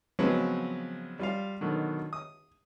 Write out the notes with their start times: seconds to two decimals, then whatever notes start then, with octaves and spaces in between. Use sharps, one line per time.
0.19 C#3 F3 F#3 G#3 B3 C4
1.19 G3 F4 F5
1.61 B2 D3 D#3 F#3
2.13 D#6